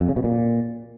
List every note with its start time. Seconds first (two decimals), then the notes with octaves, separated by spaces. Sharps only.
0.01 F2
0.09 C#3
0.16 B2
0.24 A#2